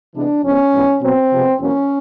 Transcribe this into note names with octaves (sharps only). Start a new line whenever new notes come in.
C3 E3 G#3 B3 D4
F2 C3 E3 G#3 B3 C#4
G#2 E3 G3 B3
B2 F#3 B3 C4
C3 F3 G#3 B3
E2 B2 F#3 A#3 C#4